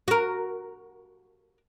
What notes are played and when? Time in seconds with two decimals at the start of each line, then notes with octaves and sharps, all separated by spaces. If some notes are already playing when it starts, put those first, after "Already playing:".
0.08 F#4 A#4